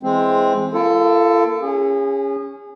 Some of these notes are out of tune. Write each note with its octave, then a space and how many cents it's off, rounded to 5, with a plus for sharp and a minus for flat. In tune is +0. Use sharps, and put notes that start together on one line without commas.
E3 +0 G#3 +0 C4 +5
A#3 +0 F4 -45 A4 +10
C#4 +0 G#4 -35